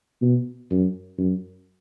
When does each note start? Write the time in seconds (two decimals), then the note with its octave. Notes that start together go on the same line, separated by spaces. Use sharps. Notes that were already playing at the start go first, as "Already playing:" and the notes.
0.22 B2
0.71 F#2
1.18 F#2